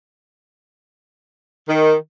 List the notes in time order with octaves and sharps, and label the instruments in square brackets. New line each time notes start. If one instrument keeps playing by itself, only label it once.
[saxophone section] D#3